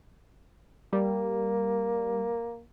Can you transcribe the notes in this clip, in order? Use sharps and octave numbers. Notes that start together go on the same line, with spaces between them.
G3 A#3